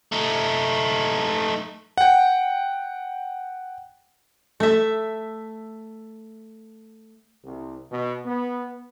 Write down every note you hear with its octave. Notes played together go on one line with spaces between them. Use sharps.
A3 D#4
F#5 G5
A3 E5
C2
B2
B3